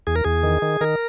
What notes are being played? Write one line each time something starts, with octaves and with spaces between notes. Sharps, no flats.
E2 G#4
A#4
E2 G#4
D#3
D#3
D#3 A#4